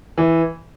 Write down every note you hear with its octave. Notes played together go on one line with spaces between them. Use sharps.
E3